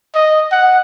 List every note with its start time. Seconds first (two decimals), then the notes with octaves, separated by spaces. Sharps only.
0.15 D#5
0.52 F#5